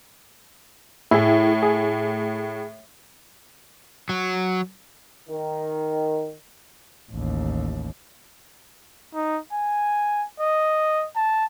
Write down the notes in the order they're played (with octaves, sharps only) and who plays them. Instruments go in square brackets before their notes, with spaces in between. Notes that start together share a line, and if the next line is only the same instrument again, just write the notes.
[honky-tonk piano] A2 [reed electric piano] E4 G#4
[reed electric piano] G#4
[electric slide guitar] F#3
[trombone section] D#3
[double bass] A1 D#2
[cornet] D#4
G#5
D#5
A5